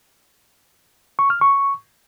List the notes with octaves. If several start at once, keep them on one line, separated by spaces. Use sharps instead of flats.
C#6
F6
C#6